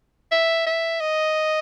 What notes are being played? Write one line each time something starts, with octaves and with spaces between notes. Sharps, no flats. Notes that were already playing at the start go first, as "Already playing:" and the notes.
E5
E5
D#5